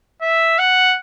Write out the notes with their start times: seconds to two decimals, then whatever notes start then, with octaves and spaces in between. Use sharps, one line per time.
0.22 E5
0.59 F#5